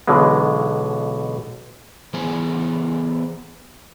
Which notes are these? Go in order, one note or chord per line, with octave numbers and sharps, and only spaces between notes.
B1 B2 D3 E3 G#3
E3 B3 G#4 C5 G#5